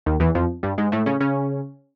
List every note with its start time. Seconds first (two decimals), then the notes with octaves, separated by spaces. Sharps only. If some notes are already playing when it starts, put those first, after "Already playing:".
0.06 D#2 D#3
0.20 E2 E3
0.35 F2 F3
0.63 G2 G3
0.78 G#2 G#3
0.92 A2 A3
1.06 C#3 C#4
1.21 C#3 C#4